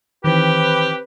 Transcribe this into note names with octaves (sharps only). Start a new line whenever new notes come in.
D#3 E3 C4 G4 B4